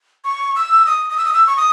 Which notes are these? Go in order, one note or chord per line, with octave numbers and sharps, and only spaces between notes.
C#6
E6
D#6
D#6
E6
D#6
E6
C#6
D#6